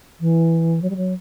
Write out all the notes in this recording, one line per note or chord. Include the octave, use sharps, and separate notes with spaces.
E3
F#3
G3
F#3